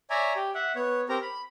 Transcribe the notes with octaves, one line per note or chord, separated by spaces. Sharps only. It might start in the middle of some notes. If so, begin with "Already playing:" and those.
C#5 D5 E5 G#5 A#5
G4
E5 F#5
B3 C#5
C4 G4 A#4 A#5
B5